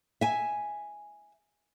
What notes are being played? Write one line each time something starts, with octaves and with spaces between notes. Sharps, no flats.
E5 G#5